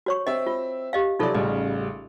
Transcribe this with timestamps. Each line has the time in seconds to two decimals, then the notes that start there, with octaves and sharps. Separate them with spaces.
0.06 F#4 C#5 C#6
0.27 C4 D#5 E5
0.47 F4
0.93 G4 D#5 F5
1.19 C3 F#3 D#4 F4 A4 D5
1.35 A1 C#3 G3 D#5